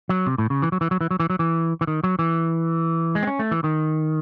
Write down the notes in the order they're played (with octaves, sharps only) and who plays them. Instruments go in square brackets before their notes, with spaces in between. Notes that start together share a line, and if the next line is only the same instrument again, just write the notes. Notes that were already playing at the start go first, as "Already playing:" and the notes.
[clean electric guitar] F#3
C3
A2
C#3
E3
F#3
E3
F#3
E3
F#3
E3
F#3
E3
E3
D#3
F#3
E3
G#3
C4
C#4
A3
E3
D#3